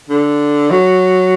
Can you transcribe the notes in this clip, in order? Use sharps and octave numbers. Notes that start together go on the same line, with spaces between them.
D3
F#3